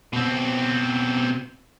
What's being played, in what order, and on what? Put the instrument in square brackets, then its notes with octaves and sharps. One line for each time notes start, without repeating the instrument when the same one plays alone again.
[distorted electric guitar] B2 C4